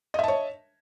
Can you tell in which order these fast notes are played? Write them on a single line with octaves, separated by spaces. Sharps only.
D#5 E5 A5 C#5